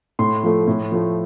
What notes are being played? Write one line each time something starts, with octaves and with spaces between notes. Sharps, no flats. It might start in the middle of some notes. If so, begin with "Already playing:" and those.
A2 C6
F3 A3
A2
F3 A3